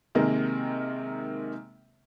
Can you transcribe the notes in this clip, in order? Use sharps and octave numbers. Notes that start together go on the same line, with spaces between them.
C3 D#3 G#3 A#3